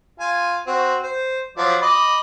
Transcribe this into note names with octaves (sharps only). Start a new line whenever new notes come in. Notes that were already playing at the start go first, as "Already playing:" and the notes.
F4 G#5
C4 F#4
C5
F3 F#3 D5
D#5 B5 D6